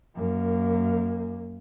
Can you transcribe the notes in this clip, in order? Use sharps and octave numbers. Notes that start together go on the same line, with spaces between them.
F#2 A#3